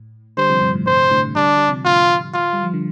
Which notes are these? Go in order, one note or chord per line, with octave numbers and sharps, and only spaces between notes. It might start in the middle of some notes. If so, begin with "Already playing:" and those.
Already playing: A2
D3 G3 C5
C3 F3
G2 C3
A2
G2 C3 C5
A2 D3
D3 G3 D4
G3
C3 F3
A2 D3 F4
F4
G3
F3
D3